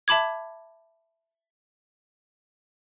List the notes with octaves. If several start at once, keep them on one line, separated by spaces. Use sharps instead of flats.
E5 A5 B5 D6 G#6